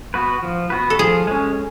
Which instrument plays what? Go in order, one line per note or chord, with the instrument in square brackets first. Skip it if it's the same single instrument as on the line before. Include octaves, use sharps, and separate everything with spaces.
[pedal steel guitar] B3 F#4 B4
F3
B3 F#4 B4
[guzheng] A4
[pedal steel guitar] F3 [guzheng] G#4
[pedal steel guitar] G#3 C#4